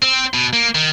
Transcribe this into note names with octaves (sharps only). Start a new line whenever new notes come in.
C4
B2
A#3
D#3